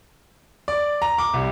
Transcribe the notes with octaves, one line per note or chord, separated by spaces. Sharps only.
D5
A#5
D6
C2